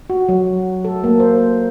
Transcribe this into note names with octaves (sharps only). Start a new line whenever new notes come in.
F#4
F#3
A4
A#3
C5